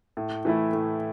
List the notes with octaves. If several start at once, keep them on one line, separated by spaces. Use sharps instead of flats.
A2
E3 A3 E4
A2